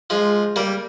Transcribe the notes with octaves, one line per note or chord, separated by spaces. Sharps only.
F3 G#3
G3 A#3